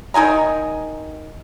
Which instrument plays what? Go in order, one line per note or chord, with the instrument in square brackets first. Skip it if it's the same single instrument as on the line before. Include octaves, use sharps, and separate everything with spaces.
[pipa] D#3 D#4 G#5 A#5